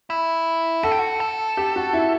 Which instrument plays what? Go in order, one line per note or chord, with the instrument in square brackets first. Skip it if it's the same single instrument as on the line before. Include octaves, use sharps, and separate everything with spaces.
[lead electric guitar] E4
[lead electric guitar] F#4 [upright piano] A4
[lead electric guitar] G4
F#4
A4
[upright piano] G4
F#4
E4